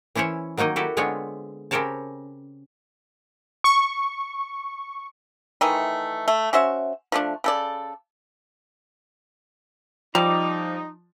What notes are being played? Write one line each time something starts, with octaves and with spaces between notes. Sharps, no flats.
E3 C#4 E4 C5 C#5
D#3 F#3 A#3 D#4 D#5
E4 F#4 G4 A4
D3 G#3 B3 C4 F4 C#5
C#3 C4 G4 A#4 C#5 A5
C#6
D#3 E3 A3
A3
C#4 F#4 C5 E5
F3 A3 D4
C#3 A4 D5
F3 G3 D#4 A#5 D6